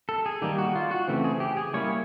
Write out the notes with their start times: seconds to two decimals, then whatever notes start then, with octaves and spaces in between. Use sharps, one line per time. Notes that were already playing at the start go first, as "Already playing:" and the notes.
0.09 A4
0.26 G#4
0.42 D#3 G3 A#3 D#4 G4
0.58 F#4
0.75 F4
0.91 F#4
1.08 C#3 E3 A3 C4
1.24 G#4
1.40 G4
1.57 G#4
1.74 G3 A#3 C#4 E4 C#5